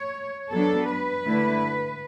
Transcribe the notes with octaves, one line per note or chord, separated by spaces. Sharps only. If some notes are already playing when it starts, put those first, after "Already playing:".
Already playing: C#5
F#3 B3 D4 A4
B4
D3 A3 E4